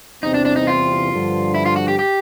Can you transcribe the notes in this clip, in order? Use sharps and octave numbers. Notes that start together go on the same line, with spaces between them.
E2 C3 E3 G3 C4 D#4
D4
D4
D#4
F4
G2 D3 F3
E4
F4
F#4
G4
G4